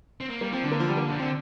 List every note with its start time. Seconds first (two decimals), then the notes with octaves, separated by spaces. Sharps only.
0.20 C4
0.30 A#3
0.41 G3 A#3
0.52 F3 C4
0.63 D3 D4
0.72 A#3
0.80 F3
0.88 G3
0.97 A#3
1.08 F3 D4
1.19 D3 C4